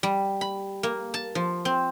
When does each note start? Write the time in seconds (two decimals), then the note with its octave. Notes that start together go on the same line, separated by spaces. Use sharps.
0.03 G3
0.41 B5
0.83 A#3
1.14 A5
1.35 F3
1.65 C4